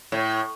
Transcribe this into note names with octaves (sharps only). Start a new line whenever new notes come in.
A2